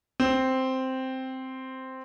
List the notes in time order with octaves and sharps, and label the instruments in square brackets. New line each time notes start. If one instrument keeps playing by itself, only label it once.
[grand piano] C4